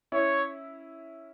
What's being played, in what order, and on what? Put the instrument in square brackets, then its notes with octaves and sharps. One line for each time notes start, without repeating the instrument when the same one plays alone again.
[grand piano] C#4 E4 [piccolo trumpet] C#5